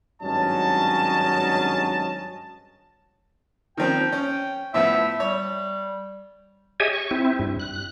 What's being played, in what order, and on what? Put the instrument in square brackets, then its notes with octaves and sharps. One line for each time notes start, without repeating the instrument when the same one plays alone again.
[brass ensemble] G#1 G2 F#3 C#4 D#5 A5
[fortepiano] D#3 F3 C4 [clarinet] G5
[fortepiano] C#4
[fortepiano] A2 F3 B3 [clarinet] E5
[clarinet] G3 [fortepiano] C#5
[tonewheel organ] G4 G#4 C#5 D#5 E5 G#5
C#6
C4 E4
G2
F#6